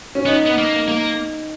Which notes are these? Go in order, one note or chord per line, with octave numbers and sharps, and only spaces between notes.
C#4
B3 D#4
B3
A#3
A#3